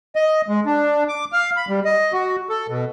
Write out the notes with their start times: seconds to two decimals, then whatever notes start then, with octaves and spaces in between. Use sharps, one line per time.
0.16 D#5
0.48 G#3
0.66 D4
1.09 D6
1.32 F5
1.57 B5
1.68 G3
1.85 D#5
2.13 F#4
2.49 A4
2.69 B2